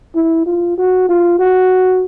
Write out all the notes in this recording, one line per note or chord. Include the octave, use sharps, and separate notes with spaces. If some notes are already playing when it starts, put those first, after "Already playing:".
E4
F4
F#4
F4
F#4